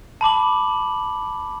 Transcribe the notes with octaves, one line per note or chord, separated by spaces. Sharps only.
A5 B5 D6 F#7